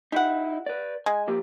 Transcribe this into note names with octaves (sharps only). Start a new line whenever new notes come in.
D#4 E4 G4 F#5
B4 D5
G#3 G#5
F3 A#3 G4